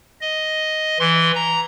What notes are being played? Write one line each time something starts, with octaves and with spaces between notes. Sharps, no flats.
D#5
E3 C6
A#5